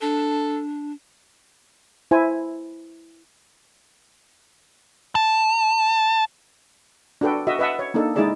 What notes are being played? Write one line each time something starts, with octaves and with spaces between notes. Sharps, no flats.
D4 A4
E4 C5 G#5
A5
D4 F#4 A4 B4 G5
F#4 D#5 E5
B4 D#5 E5 F#5 A5
C#5
A#3 D4 D#4 A4
G#3 D#4 E4 G#4 D5 A5